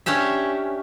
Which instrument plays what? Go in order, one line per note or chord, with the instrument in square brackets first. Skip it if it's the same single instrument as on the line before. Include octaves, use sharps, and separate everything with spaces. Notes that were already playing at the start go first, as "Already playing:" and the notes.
[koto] C#4 D4 G4 E5